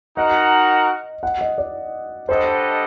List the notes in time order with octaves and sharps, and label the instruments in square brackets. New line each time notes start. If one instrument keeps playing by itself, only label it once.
[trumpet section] D#4 F#4 A#4 F#5 [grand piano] D#5
[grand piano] F#5
D#5
D5
[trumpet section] G3 D4 A4 D#5 F#5 [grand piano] C5